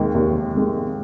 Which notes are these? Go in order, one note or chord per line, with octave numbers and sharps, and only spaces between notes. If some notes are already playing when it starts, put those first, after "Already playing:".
Already playing: D#2 D#3 G#3
D#2
D#3 G#3